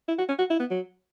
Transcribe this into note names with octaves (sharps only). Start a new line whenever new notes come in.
E4
F#4
C#4
F#4
E4
B3
F#3